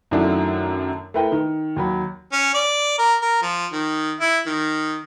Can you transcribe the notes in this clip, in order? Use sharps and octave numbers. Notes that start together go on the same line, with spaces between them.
F#2 D#3 F#3 A3 D4 E4
A3 E4 A#4 B4 G5
D#3
D#2 F#3 B5
C#4
D5
A#4
A#4
F3
D#3
E4
D#3